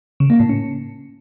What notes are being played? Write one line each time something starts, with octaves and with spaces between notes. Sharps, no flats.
C#3
A#3
A2
C#4